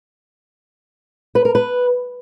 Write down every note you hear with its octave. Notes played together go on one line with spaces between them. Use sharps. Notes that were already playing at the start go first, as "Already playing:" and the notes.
B4
A#4
B4